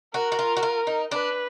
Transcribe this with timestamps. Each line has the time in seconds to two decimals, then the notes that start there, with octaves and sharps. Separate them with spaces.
0.14 F#4 A#4
0.32 F#4
0.39 F4
0.57 F#4
0.63 F4
0.87 D#4
1.11 D4 B4